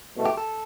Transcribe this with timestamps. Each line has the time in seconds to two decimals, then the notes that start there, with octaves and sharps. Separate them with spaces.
0.15 C2 B2 A3
0.26 G4
0.37 A4